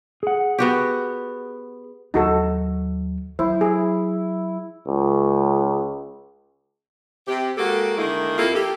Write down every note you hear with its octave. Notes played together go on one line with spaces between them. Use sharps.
G#4 F#5
B3 F#4 G4
D#2 F#3 D#4 F#4 A4
F#3 E4 C5
G#4
C#2
C3 G4
G#3 A#3 F#4 G4 A4
D3 D#3 G#3 A#3 E4
F2 A#3 E4 F4 G4 A4
G4 A4